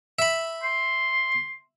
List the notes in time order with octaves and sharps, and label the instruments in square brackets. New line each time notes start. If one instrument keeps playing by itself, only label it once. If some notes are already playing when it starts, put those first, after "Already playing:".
[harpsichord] E5 B5
[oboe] C6